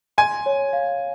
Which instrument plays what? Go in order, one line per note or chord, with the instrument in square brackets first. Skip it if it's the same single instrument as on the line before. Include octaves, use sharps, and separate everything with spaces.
[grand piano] G#5 [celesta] C6
[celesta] C#5
F5